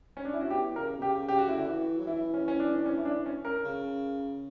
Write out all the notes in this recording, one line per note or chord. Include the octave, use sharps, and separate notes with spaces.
C#4
D4
E4
F#4
E2 G4
C#3 A#4
B2
C#3 G4
C#3 G4
F#4
E4
D3 F#4
E3
F#3
E3 E4
C#4
C#4
D4
D4
C#4
E4
D4
C#4
A#4
C#3